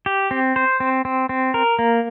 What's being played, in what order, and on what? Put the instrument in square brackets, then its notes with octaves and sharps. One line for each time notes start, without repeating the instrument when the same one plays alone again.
[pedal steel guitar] G4
C4
C5
C4
C4
C4
A#4
A#3